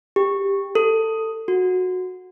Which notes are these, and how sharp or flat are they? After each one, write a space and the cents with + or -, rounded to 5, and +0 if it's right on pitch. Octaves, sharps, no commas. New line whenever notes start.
G4 +15
A4 +20
F#4 -15